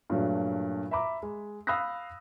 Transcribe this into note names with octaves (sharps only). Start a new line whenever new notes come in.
G2 A#2 F#3 A3
E5 A#5 B5 D6
G#3
F5 B5 D#6 E6 F#6 A#6